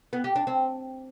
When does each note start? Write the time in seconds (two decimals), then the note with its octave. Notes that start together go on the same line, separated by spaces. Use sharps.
0.13 B3
0.24 G4
0.36 D4
0.47 C4